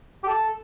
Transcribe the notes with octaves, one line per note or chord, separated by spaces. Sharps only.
G4
A4